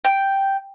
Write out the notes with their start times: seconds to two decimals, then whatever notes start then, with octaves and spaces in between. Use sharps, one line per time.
0.05 G5